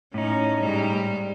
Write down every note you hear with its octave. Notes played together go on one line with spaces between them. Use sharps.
A2 C#4 D#4
G#2 G3